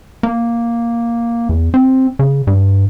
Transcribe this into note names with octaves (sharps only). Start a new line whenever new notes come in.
A#3
E2
C4
C#3
G2